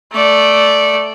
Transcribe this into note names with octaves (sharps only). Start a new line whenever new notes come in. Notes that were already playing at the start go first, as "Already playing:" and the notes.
A3 D5